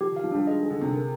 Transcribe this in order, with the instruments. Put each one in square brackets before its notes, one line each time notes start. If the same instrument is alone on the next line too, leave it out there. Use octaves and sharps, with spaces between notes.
[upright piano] F3 [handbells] G4
[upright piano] D#3 [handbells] F5
[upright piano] F3
[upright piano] G3 [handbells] D4
[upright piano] G#3 [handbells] D#5
[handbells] G#4
[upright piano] D3
[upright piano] C3 [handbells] G#4
[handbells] A#4